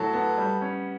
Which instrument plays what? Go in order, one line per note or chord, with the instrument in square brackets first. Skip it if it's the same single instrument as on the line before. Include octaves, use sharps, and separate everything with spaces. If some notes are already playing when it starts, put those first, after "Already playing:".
Already playing: [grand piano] A2 F#3 E4 [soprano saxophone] A4
[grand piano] B3
G3
C#4